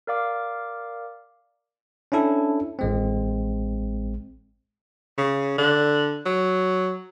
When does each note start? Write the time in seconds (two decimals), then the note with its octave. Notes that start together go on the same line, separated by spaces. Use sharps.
0.07 A#4 D5 F5 D6
2.12 C#4 D4 E4 A4
2.79 A1 G#3 C4
5.18 C#3
5.58 D3
6.26 F#3